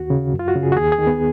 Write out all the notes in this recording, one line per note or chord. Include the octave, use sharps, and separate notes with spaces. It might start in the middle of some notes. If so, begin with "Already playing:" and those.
Already playing: D#2 F#4
C#3
F#2
F4
F#4
C#3
G#4
F#4
D#2 G#4
G#4
D#3
B3